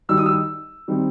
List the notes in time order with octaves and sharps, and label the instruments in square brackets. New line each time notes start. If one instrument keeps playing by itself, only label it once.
[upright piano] D#3 G3 D#4 E6
D#6
E6
D#3 G3 C4 D#4